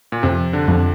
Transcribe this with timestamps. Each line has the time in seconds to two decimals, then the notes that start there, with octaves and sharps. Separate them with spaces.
0.12 A#2
0.23 F2 C3
0.53 D3
0.68 F2